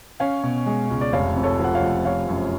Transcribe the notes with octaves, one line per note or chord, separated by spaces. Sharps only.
C#4 C#5 F5
B2
G#3
C#2
D5
F1 C#5 F5
F2
A4 C#5
F3 F#5
C#5 F5
F1
F3 C#5 F5
F#2